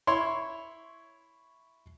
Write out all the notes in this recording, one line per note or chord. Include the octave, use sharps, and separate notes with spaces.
E4 C#5 C6